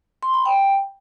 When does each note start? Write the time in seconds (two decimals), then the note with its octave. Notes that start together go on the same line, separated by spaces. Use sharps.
0.23 C6
0.34 B5
0.45 G5